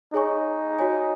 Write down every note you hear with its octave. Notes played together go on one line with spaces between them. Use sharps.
D#4 G#4 C#5 G#5 C#6
F#4 C#5 G#5